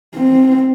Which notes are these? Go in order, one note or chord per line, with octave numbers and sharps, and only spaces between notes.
C4